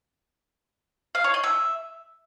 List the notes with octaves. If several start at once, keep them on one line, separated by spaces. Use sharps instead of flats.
F5
C#5
D#5
E5